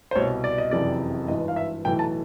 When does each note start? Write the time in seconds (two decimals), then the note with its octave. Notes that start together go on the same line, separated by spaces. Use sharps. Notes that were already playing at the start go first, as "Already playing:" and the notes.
0.11 C5
0.16 C2 B2 C#5
0.44 D5
0.58 D#5
0.71 F#1 F2 C3 E3 D5
1.28 G#1 G2 E3 D#5
1.48 F5
1.56 E5
1.85 B1 A2 E3 G5
1.99 A5